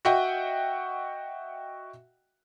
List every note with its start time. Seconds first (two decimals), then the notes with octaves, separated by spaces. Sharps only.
0.05 F#4 D#5 E5 F#5 G5